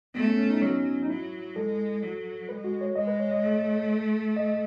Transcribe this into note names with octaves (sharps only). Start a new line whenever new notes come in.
A3 B3
C#4
C#4
D#4
F#3 C#4
D#4
F#3 E4
G#3 A4
F#3
G#3 B4
F#4
C#5
G#3 D#5
B4
C#5
D#5
A3
D#5